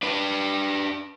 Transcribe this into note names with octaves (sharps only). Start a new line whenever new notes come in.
D4 B4